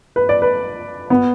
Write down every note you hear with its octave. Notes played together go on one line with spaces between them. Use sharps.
B4
D5
B4
B3